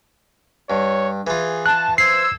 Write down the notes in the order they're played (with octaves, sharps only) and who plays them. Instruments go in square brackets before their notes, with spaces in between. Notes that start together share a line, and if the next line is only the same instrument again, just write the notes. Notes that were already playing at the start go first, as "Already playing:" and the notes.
[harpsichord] G2 [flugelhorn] C#5
[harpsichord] E3 F4 [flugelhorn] G#4
[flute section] A5 [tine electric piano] F#6
[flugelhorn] C5 [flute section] E6 G#6 [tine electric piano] C7